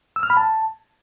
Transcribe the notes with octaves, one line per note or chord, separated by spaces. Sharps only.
E6
F6
B5
A5